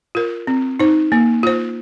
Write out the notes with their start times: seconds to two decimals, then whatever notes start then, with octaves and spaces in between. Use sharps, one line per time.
0.15 F4 A#4
0.47 C4
0.80 D#4 C5
1.12 A#3
1.43 F4 C5